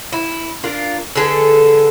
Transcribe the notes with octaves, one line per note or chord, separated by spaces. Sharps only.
E4
D4 F4 A#4
D3 G#4 A4 B4